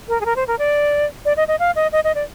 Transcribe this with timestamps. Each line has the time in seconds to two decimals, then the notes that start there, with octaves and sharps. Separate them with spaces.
0.09 A#4
0.21 G#4
0.26 A#4
0.36 C5
0.48 A#4
0.59 D5
1.25 D5
1.37 D#5
1.48 D#5
1.59 F5
1.76 D#5
1.92 D#5
2.04 D#5
2.15 D5